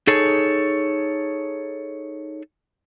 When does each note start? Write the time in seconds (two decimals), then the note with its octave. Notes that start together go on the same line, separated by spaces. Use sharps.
0.07 D#4 G#4 A4 C#5